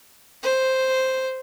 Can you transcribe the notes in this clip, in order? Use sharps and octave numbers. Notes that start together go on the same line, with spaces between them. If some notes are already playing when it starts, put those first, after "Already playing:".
C5